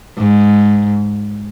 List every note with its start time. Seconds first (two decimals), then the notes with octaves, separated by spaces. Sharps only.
0.18 G#2